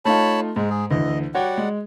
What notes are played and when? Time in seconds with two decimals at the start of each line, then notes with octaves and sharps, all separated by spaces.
0.05 A3 D#4 F4 C#5 A5 B5
0.56 G#2 G#3
0.70 G#4
0.91 D2 D3 E3 D#5
1.35 G3 F#4 C#5 D5 F#5 G5
1.58 G#3